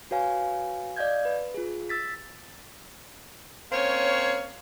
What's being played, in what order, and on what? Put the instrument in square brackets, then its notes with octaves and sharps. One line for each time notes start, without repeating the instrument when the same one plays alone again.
[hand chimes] F#4 B4 C#5 F5 G#5
D5 D#5 F5 G6 G#6
B4
F4 G#4
E6 A6 B6
[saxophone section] A#3 C4 C#4 C#5